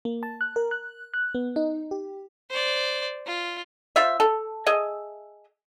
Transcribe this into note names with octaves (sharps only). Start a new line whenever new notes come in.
A#3
A5
F#6
A#4
F#6
F#6
B3
D#4
G4
C5 D5
F4
F4 C5 E5
A4
G#4 D#5 E5